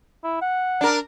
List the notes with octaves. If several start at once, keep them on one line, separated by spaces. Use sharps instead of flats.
E4
F#5
D4 A#4